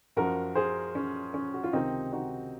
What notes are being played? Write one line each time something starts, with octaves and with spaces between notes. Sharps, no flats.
F#2 F3 F#4 A#4
G#4 C5
C#4
C#4
F#4
F4
C#2 C3 D#3 C4 D#4
D#4 F#4